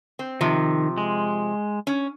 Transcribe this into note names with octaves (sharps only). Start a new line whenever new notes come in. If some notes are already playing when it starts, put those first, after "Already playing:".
C4
C3 D#3 F3
G#3
C#4